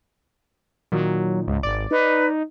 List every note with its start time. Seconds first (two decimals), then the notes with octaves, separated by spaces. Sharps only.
0.92 A#2 D#3 F#3
1.48 C#2 G#2
1.63 G#1 D5
1.91 D#4 B4